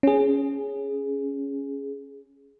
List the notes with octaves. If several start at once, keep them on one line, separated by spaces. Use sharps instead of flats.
C#4 G#4